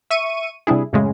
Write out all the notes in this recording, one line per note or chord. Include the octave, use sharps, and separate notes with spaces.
E5 C#6 D#7
C3 G3 D4 E4 G#4
F#2 A2 C#3 G#3